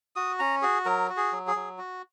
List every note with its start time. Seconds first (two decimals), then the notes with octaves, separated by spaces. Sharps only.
0.16 F#4 D#6
0.39 C#4 A#5
0.62 F#4 G#4
0.85 F#3 A#4
1.09 F#4
1.17 G#4
1.32 F#3
1.47 G#4
1.55 F#3
1.78 F#4